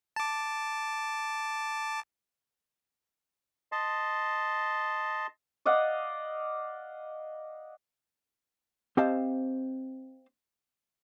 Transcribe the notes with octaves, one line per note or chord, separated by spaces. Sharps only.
A5 D6
D#5 A5 C6
D5 D#5 F5 F#5
C4 G4 C5 D#5 F5 A5